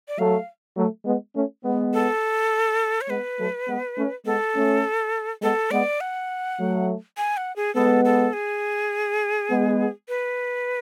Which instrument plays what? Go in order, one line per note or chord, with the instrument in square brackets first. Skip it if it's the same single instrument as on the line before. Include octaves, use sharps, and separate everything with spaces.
[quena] D5
[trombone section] F#3 A3 [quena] F5
[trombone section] F#3 A3
G#3 B3
A3 C#4
G#3 B3
[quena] A4
C#5
[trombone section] G#3 B3 [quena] B4
[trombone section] F#3 A3
G#3 B3
A3 C#4
[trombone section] G#3 B3 [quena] A4
[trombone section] A3 C#4
[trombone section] G#3 B3 [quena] A4
[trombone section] G#3 B3 [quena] D5
[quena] F#5
[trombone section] F#3 A3
[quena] G#5
F#5
G#4
[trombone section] G#3 B3 [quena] A4
[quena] A4
G#4
[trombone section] G#3 B3
[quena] B4